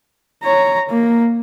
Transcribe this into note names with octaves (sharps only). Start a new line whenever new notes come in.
C#5 A#5
A#3